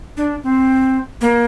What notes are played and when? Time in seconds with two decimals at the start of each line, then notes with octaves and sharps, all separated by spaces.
0.17 D4
0.43 C4
1.21 A#3